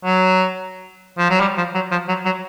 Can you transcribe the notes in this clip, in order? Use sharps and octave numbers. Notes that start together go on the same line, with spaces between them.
F#3
F3
F#3
G3
F3
F#3
F3
F#3
F#3